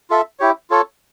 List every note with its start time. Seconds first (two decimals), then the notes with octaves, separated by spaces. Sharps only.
0.10 F4 A4 E5
0.40 E4 G4 C#5
0.70 F4 A4 C#5